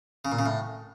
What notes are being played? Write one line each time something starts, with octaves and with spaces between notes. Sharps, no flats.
C#3
A#2
C#3
A2